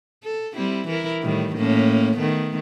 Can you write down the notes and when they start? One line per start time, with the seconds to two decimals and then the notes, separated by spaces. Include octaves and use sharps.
0.23 A4
0.56 G3 C4 E4
0.88 E3 E4 A#4
1.23 A2 D#3 G3
1.55 A2 A#3 C#4
2.17 D#3 A3 B3